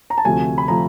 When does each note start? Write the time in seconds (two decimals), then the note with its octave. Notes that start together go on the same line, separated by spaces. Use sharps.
0.10 A#5
0.18 A5
0.25 D2 C3 F3 A3 G#5
0.58 B5
0.68 C3 F3 A3 A#5